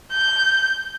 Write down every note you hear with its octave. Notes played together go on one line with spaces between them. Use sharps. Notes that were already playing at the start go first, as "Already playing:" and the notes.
G6